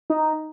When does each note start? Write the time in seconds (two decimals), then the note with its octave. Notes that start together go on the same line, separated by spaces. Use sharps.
0.10 D#4